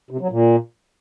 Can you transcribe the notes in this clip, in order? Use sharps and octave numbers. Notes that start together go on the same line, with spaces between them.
C3
F#3
A#2